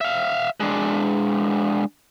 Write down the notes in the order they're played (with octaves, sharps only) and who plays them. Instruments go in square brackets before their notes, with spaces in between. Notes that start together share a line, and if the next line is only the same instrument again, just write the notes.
[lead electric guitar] E5 F5
G#3 D4